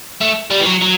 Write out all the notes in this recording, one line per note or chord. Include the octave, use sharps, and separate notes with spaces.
A3
G3
E3
F#3
F#3